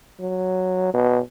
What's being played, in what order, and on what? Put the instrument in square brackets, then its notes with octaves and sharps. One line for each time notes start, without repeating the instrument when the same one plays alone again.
[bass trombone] F#3
B2